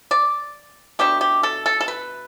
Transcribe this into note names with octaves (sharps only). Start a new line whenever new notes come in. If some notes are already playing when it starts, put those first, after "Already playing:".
D5
B2 A3 D4 G4
G4
A4
A4
A4
B4